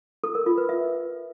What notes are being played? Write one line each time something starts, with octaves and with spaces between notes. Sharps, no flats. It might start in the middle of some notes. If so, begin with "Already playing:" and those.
A4
A#4
F4
B4
E5